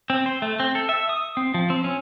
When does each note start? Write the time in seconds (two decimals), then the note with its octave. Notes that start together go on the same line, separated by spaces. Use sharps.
0.10 C4
0.26 C5
0.42 A3
0.60 C4
0.75 A4
0.89 E5
1.09 D#6
1.37 C4
1.54 F3
1.70 C4
1.84 C#4